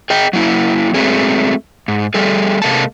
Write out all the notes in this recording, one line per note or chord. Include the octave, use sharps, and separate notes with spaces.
G#4 D#5 G5
F#3 A#3 E4
F#3 G#3 A3 C4 G#4
G#2
G3 G#4 A4
C3 G#3 A#3 A4 A5